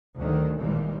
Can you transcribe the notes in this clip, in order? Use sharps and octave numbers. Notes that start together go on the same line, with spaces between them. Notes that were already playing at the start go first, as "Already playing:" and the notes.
D2 D#3 F#3
G#1 D#2 A#2 E3 G3